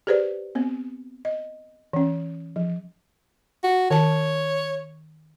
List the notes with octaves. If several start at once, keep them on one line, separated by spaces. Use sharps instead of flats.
G4 G#4 B4 C5 D5
B3 C4
D#5
E3 C#4
F3
F#4
D#3 C#5 A5